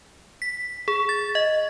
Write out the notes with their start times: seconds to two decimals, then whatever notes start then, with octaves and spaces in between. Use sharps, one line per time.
0.42 B6
0.88 G#4
1.09 A6
1.35 D#5